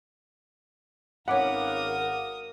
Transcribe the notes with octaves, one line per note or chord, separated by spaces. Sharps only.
G#1 C#4 A#4 B4 F5 F#5 D6 D#6